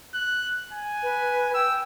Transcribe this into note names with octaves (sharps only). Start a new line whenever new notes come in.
F#6
G#5
B4
G5 E6